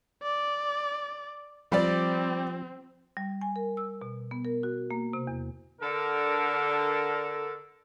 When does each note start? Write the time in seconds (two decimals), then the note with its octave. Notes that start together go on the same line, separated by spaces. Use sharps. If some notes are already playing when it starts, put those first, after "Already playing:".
0.23 D5
1.72 F3 G3 C4 G4 D5
3.17 G3
3.41 G#5
3.56 A#4
3.77 E6
4.02 B2
4.31 B3
4.45 A#4
4.63 F#4
4.91 A#3
5.13 C3
5.27 E2
5.81 D3 A4 A#4